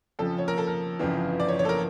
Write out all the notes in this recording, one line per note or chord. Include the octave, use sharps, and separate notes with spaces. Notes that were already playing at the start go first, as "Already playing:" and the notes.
F2 C#3 F3 A4
C#5
A#4
A4
A#4
G1 F2 C#3 E3
D5
C#5
C#5
A4
A#4